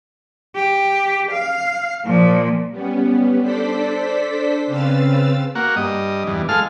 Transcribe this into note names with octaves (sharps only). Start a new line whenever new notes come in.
G4
F5
A#2 F3
G3 B3 C#4
D4 A4 C5 D5 B6
C#3 C4 B4 F5 E6 A6
A#3 F#4
G2 D#5
E2 G2
G#3 A4 F5 F6